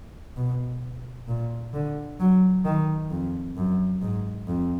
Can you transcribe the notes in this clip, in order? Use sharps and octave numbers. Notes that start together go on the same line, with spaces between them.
B2
A#2
D3
F#3
D#3
F2
F#2
G#2
F2